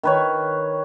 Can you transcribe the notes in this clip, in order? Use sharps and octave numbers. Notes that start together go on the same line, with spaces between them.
D#3 B4 C#5